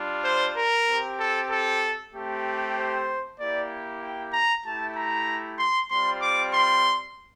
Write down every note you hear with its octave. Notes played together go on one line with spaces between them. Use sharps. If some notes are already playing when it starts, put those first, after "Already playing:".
Already playing: G3 D4 F4
C5
A#4
C4 G4
A4
A4
A3 C4 G4
C5
A#3 E4 G4 D5
G5
A#5
A3 E4 G4 A5
A#5
C6
G3 C4 F4 C6
D6
C6